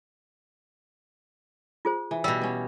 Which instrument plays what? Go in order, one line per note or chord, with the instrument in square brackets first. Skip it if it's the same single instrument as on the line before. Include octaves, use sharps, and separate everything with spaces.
[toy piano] F4 G#4 C5
[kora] E3
[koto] B2 G3 [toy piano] E6
[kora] B3 C#4